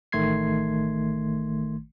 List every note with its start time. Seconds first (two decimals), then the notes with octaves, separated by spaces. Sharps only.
0.12 A1 D#3 A3 C6 G#6 C7